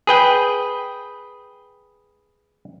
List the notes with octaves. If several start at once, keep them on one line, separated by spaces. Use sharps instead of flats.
G#4 B4 G5